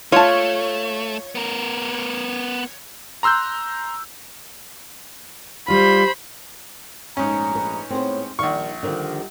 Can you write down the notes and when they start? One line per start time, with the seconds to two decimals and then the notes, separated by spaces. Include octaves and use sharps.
0.12 A3 F4 C#5 A5
1.35 B3 A#4
3.23 A#5 C6 E6 F#6 G6
5.68 G3 F4 C5 B5
7.17 A#1 G#2 A3 C#4 A#5
7.55 B4
7.90 A2 B3 C4 G#4 C5 C#5
8.39 A#1 D#3 G3 D5 F5 C#6
8.83 D3 D#3 F3 G3